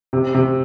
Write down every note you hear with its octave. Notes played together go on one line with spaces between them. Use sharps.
C3
C3